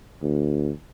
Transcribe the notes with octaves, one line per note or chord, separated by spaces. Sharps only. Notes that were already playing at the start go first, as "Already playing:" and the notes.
D2